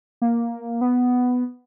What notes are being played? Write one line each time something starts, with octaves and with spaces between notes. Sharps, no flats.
A#3
B3